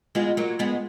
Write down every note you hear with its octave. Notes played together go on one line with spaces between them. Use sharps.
G#3 B3 F4
F#3 A#3
G#3 B3